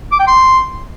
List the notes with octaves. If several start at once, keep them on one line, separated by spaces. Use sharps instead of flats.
D6
G5
C6